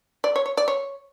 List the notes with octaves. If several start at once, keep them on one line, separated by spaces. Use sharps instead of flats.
D5
C#5
C#5
D5
C#5